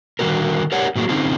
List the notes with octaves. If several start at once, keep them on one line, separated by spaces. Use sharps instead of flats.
D3 D#3 G3 B3 F#4 A#4
G4 A#4 C#5 D5 F#5
A2 D3 F#3 A#3 G#4
D3 C4 C#4 D#4 F4